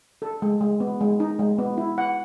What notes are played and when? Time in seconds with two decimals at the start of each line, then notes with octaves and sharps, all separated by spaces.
0.22 A4
0.42 G#3
0.61 G#3
0.80 B3
1.01 G#3
1.20 D#4
1.39 G#3
1.58 B3
1.77 E4
1.98 F#5